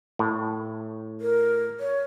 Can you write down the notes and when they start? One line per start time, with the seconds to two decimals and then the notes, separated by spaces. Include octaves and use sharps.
0.19 A2
1.21 A#4
1.80 C#5